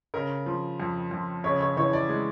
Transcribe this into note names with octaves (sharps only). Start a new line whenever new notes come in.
C#3 A#4
F3
F2
F2
C#3 C#5
C#5
E3 C#5
D5
G#3